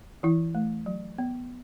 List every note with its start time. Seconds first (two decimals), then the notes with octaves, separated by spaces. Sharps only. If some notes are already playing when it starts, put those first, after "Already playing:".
0.23 E3 E4
0.55 A3
0.86 F#3
1.18 B3